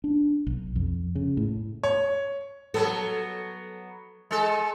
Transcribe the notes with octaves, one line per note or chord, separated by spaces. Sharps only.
D4
B1
F2
C#3
A2
C#5
F#3 B3 A4
G#3 A4